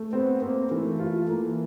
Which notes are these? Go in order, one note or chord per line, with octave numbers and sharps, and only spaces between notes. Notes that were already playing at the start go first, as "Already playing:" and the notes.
Already playing: A3
B3 C4
A#3 C4
E3 A3
F4
E3 A#3